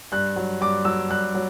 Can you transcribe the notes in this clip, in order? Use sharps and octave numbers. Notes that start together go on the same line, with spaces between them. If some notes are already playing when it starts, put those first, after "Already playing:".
G2 F#6
F#3
G2 D6
F#3 E6
G2 F#6
F#3